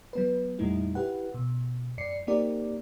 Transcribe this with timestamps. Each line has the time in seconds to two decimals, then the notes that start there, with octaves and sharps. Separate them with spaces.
0.13 F#3 B3 B4
0.59 F2 A#2 G3 A3 D#4 E4
0.95 E4 G4 B4 F#5
1.34 B2
1.98 F#2 D5 C7 C#7
2.27 A#3 C4 D#4 G4 A#4 D5